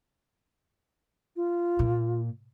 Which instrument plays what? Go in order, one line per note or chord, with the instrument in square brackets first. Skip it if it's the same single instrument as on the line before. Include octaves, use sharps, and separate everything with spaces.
[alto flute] F4
[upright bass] A#2